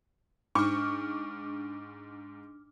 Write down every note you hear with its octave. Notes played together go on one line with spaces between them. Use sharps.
G#2 D4 C#6 D6 F6